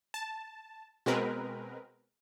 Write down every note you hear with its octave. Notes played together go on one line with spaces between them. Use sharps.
A5
B2 G#3 C4 A#4 B4